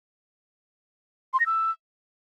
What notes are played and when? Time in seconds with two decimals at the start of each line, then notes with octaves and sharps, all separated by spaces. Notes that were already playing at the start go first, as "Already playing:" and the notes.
1.34 C6
1.40 A#6
1.46 E6